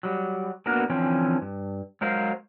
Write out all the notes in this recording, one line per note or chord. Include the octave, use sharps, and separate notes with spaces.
F#3 G3
A#3 B3 D4 F#4 A#4
D3 E3 F3 C4 C#4
G2
F#3 G#3 A#4 C5 F5